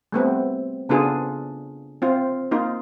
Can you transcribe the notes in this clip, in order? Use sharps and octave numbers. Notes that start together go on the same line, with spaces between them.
G3 A3 B3 C4
C#3 B3 D4 F4 G#4 A4
C4 F4
A#3 D#4 F4